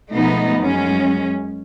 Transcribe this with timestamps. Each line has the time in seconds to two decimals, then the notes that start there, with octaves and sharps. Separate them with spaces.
0.15 B2 F3 G#3 A3 B3 D#4
0.58 F#2 G#3 C#4